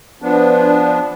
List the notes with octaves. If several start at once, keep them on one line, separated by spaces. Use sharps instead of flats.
F3 B3 D4